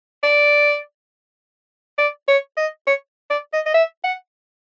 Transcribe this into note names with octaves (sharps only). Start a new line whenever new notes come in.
D5
D5
C#5
D#5
C#5
D5
D#5
D#5
E5
F#5